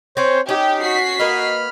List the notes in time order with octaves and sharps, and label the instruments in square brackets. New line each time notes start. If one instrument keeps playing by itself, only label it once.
[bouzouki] C4 C#4 [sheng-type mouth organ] C5 C#5
[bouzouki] C#4 [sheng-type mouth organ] D#4 [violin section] G4
[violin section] F#4 B6 C7
[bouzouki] A#3 B4 D#5 [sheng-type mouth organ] B5 F6